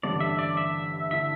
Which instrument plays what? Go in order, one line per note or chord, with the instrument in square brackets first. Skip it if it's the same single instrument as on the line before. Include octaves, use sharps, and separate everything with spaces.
[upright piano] A1 G2 D3 A3 C4 [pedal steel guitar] D5
[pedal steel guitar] E5
D5
E5
[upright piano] D3 A3 E4 [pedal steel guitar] E5